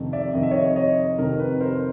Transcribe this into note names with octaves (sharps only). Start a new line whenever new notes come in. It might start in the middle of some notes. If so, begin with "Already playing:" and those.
Already playing: F2 C3 D#3
D5 E5
F2 C3 D#3 D#5
E5
C#5 D#5
C#5 D#5
F2 C3 D#3 A#4
B4
A#4 C5